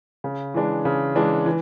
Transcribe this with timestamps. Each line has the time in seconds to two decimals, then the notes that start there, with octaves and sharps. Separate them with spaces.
0.24 C#3
0.54 E3 G#3 D4
0.85 C#3
1.15 E3 G#3 D4
1.46 E3